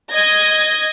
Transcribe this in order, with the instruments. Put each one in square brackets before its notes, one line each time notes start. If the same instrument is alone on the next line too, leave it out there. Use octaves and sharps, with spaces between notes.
[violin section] D#5 G#6 A#6